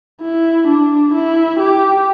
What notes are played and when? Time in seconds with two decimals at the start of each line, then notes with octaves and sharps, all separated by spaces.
0.21 E4
0.67 D4
1.14 E4
1.60 G4